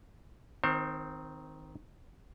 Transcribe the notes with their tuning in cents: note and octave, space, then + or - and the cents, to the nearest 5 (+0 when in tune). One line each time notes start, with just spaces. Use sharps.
D#3 +0 C4 -15 C5 +35